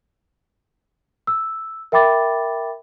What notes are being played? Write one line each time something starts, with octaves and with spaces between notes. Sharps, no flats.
E6
A#4 E5 G5 B5 D6 A6